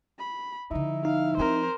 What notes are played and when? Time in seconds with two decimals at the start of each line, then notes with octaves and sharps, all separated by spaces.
0.19 B5
0.71 D3 F3 D#4 E4
1.05 D#4 F5
1.37 F3 C4 A#4 C5